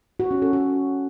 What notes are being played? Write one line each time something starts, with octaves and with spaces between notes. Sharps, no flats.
F#4
C#4
A4
F#4